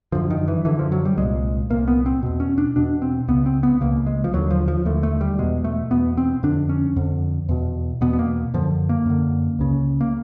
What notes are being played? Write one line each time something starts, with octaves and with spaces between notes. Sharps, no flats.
F#2 D3 F3
D#3
E3
F#2 D3 E3
F3
F#3
G3
C2 A#2 G#3
C2 A#2 A#3
B3
C4
E2 B2
C#4
D4
E2 B2 D4
C4
C#2 C#3 B3
C4
B3
C#2 C#3 A#3
G#3
F3
D#2 D3 F#3
F3
F3
D#2 D3 A3
A3
G3
E2 B2 G#3
A3
E2 B2 B3
C4
F2 D3 D4
C#4
F2 D3
E2 B2
E2 B2 B3
B3
A#3
F#2 D3 F3
A#3
F#2 D3
C#2 C#3
A#3